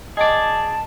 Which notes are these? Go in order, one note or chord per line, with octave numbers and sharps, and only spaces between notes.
G#4 D5 D#5 G5 A5